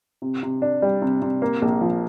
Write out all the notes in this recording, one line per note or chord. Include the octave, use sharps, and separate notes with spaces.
C3
C3
D4
G3
C3
C3
A#3
A#1
F3